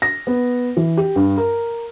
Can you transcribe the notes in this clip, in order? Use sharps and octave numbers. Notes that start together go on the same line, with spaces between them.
A#6
B3
E3
G4
G2
A#4